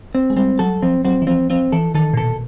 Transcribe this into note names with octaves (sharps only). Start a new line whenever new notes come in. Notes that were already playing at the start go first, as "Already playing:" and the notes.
C4
G#3
G3 C4
F#3 A4
F3 C4
F#3 C4
E3
F3 C4
F3 C4
E3 A4
D#3 A4
A#2
B2 A4